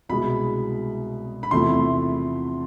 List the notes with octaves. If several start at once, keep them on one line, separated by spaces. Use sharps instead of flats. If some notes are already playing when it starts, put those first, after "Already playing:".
C2 B2 G#3 B5
B5
E2 C3 F3 A3 C6